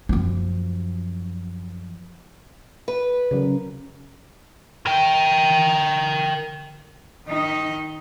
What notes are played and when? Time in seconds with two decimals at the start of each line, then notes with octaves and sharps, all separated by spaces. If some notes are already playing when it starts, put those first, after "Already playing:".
0.09 F#2 F3
2.88 B4
3.31 C#3 F#3 A#4
4.86 A#4 G5
7.27 D#3 D#4